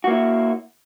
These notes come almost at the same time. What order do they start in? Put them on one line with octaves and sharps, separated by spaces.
F#4 A#3 E4